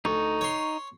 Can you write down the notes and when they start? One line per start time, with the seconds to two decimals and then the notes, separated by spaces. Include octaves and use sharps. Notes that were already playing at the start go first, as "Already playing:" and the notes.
0.05 D2 D#4 C#6
0.41 C#5 C6